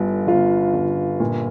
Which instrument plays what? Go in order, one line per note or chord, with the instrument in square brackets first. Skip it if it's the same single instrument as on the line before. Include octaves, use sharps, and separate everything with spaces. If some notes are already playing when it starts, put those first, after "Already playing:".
Already playing: [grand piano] G1 D3 F4
G1 F4
G1
A#2